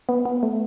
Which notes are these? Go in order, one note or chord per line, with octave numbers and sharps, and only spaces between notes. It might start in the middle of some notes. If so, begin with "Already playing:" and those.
B3
B3
A3